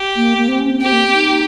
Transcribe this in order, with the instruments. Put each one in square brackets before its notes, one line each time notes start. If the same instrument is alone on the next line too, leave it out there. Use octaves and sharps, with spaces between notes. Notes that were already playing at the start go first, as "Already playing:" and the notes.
Already playing: [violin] G4
[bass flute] A#3
A#3
C4
C#4
C4
[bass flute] C4 [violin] G4
[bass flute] A#3
D#4